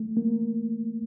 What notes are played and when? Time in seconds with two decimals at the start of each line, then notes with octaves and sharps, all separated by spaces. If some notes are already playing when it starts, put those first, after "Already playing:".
Already playing: A3
0.17 A#3